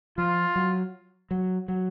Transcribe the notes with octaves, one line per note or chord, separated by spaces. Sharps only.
F3 F4
F#3
F#3
F#3